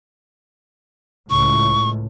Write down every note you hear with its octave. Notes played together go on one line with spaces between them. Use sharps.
C#2 A2 C#6